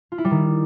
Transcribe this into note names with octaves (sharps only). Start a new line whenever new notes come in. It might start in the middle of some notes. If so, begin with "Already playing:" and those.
F4
E4
G3
D#3